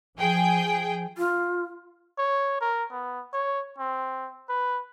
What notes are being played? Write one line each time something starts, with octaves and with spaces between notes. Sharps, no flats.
F3 G#4 G5
F4
C#5
A#4
B3
C#5
C4
B4